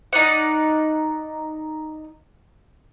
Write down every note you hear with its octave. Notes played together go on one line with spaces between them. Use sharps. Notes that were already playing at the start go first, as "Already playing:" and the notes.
D#4 D5 F#5